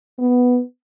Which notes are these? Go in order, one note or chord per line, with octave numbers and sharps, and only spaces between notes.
B3